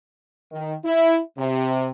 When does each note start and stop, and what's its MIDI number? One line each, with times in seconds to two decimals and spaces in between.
0.52 0.74 51
0.84 1.19 64
1.38 1.91 48